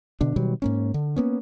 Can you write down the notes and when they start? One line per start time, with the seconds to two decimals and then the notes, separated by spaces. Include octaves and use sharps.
0.21 B2 D3 D4
0.36 B2 D#3 F#3 G3
0.62 G#2 A#3 C#4
0.94 D3
1.16 A#3 B3 C#4